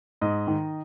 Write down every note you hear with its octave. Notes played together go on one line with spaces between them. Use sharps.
G#2 D#5
D#3